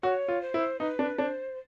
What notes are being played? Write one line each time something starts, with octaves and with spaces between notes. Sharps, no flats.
F#4 C#5
F4
C5
E4
D#4 B4
D4
D4 C#5
C5